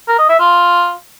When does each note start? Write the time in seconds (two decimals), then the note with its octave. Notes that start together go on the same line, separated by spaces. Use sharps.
0.08 A#4
0.18 D#5
0.29 E5
0.40 F4